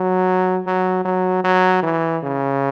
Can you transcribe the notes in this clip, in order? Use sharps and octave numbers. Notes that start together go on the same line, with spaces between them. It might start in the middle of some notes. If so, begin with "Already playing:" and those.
Already playing: F#3
F#3
F#3
F#3
E3
C#3